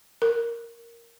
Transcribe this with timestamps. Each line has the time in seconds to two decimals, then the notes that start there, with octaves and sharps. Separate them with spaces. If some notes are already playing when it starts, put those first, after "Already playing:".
0.22 A#4